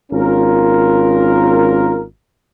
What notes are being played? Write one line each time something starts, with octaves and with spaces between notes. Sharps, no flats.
G#1 C#4 F4 A#4